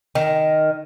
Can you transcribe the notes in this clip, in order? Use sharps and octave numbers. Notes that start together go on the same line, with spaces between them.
D#3